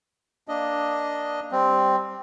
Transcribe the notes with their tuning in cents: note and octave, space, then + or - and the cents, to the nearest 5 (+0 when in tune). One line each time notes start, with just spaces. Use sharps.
A#3 +0 D4 +0 D#5 +0
G3 +0 C4 +0